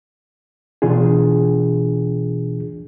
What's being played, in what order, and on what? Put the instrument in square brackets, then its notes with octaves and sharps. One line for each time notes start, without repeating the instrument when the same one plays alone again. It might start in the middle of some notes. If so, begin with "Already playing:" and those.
[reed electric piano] B2 E3 D4 F4 G#4